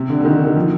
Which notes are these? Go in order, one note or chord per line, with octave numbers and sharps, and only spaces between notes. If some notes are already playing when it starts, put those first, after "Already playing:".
Already playing: C3
D3
D3
D#3
D#3
F3